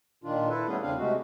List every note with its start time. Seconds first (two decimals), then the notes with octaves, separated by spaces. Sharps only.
0.24 A#2 D#3 D4 F4
0.49 E4 A4 B4
0.67 G3 A3 B3 C#4 G#4
0.82 E2 C#3 C4 D4 F5
0.98 C3 G#3 A3 F#4